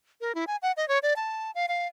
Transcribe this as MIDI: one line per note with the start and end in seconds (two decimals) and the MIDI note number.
0.21 0.35 70
0.35 0.45 64
0.47 0.57 80
0.62 0.72 78
0.77 0.88 75
0.88 0.99 73
1.03 1.14 74
1.16 1.51 81
1.55 1.66 77
1.68 1.87 77